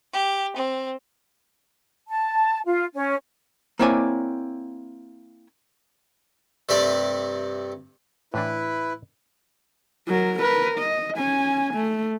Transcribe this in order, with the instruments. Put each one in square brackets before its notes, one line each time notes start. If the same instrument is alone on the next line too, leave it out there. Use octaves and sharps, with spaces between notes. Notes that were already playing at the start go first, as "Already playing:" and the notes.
[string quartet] G4
C4
[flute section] A5
F4
C#4
[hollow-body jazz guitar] A#3 C4 E4 C#5 D5 G#5
[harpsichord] G2 C3 A3 D4 D5
[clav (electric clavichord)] A2 E3 D4 [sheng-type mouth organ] E4 B4
[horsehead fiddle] F#3 A#4
A#4 B4
D#5
C#4 G#5
A3